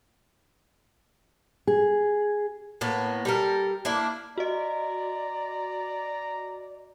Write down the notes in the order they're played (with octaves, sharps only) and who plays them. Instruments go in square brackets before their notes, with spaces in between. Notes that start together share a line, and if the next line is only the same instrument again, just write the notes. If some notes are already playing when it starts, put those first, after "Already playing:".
[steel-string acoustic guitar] G#4
[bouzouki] A2 A#3 B3
G3 A4 A#4
A#3 D4 E4
[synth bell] F#4 D#5 [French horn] D5 [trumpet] A#5